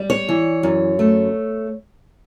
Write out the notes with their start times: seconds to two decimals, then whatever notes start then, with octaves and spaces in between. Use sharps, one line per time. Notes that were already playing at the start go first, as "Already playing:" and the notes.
Already playing: G3
0.10 C#5
0.29 E3
0.63 F#2
0.99 A3